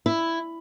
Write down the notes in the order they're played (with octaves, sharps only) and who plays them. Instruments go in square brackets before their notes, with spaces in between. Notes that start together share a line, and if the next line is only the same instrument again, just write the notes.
[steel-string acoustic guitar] E4